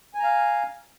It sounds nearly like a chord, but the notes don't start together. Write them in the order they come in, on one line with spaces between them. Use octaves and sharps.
G#5 A#5 F5